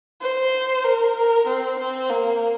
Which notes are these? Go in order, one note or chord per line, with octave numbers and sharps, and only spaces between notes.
C5
A#4
A#4
C4
C4
A#3